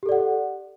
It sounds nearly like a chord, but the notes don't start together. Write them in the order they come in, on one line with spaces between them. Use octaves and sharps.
G4 A4 D5 F#5